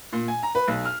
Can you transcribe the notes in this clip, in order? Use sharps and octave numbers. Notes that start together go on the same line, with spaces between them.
A#2
G#5
A#5
B4
B1
F6